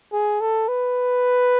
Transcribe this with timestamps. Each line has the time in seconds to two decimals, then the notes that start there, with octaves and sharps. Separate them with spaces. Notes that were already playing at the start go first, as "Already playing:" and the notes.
0.13 G#4
0.41 A4
0.68 B4